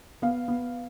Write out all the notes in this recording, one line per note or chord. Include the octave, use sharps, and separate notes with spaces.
B3 F5
B3